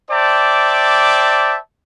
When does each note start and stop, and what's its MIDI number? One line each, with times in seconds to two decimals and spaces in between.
0.11 1.58 72
0.11 1.58 74
0.11 1.58 76
0.11 1.58 79
0.11 1.58 81
0.11 1.58 86